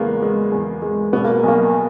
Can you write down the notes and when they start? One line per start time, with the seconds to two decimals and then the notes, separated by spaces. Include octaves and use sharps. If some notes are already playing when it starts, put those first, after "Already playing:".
Already playing: E2 C#3 G#3 A#3 B3
0.22 G#3
0.52 E2
0.82 G#3
1.13 B2 B3
1.24 A#3
1.43 B1
1.48 A#3